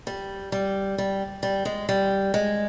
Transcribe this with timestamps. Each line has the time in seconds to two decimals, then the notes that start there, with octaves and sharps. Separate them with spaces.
0.07 G3
0.52 G3
0.98 G3
1.43 G3
1.65 G#3
1.89 G3
2.34 G#3